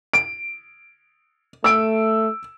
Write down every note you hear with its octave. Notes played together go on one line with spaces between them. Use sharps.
D7
A3 E6 D7